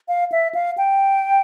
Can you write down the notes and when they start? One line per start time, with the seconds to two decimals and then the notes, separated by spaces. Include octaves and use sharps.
0.08 F5
0.32 E5
0.55 F5
0.78 G5